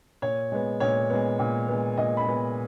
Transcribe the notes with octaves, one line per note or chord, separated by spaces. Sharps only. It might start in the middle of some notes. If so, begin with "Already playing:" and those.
A#2 C#5
G#3 B3
A#2 C#5
G#3 B3
A#2
G#3 B3
A#2 D#5
B5
G#3 B3